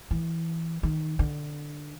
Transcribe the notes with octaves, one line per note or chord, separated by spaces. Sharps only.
E3
D#3
D3